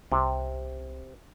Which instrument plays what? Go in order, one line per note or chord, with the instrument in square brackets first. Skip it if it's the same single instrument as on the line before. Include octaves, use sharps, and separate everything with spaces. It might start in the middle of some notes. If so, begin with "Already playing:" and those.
[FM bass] C2 [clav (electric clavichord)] C3